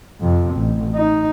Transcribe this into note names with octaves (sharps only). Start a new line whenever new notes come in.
F2 C3
A1
D#4